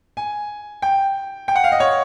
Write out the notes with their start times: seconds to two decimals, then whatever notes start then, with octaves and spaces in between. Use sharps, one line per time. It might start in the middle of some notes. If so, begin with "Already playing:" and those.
0.17 G#5
0.82 G5
1.48 G5
1.55 F#5
1.64 F5
1.72 D#5
1.80 C#5